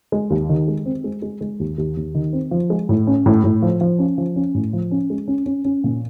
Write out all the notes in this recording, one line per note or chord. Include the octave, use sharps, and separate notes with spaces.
G#3
D#2
D#3
G#3
C4
G#3
G#3
G#3
D#2
D#2
D#2
D#3
C4
F3
G#3
A2
C#4
A2
A2
F3
F3
C#4
F3
C#4
A2
F3
C#4
G#3
C#4
C#4
C#4
A#2